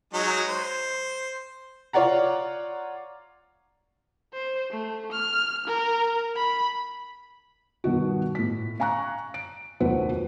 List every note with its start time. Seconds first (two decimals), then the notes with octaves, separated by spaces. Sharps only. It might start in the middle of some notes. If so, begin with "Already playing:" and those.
0.13 F#3 G#3 D#4
0.48 C5
1.93 F4 C#5 D5 F#5 A#5
4.33 C5
4.70 A3
5.12 F6
5.67 A#4
6.36 B5
7.84 G2 B2 D#3 F#4
8.35 A2 B6
8.80 F5 G#5 A#5 C#6 F#6
9.34 D7
9.80 F1 A#1 D#2 F#3 B4 C5